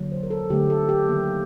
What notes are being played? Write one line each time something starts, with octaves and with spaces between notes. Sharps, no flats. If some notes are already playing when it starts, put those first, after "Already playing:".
Already playing: D3 F#3 A#3
C5
A#4
A4
D3 A3 G4
A4
G4
D#3 F#3 A#3